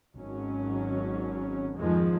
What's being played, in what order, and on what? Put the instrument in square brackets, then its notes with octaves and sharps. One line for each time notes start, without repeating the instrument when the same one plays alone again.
[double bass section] G#1 F#3 C#4
F2 G#2 D#3 F3 G#3